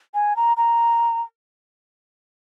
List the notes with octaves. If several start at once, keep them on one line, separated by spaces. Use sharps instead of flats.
G#5
A#5
A#5